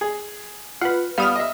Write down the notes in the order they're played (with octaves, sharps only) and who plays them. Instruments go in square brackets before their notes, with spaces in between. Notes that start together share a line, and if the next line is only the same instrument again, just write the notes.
[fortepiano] G#4
[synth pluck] F4 B4 [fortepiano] F#5
[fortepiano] G3 B3 [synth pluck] F5 D#6 F6
[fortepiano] D#5 E5